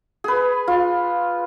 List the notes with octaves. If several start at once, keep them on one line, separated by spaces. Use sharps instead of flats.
G#4 B4
F4